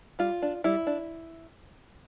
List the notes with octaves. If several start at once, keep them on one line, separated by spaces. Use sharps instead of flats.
G3 F4
D4
G3 E4
D4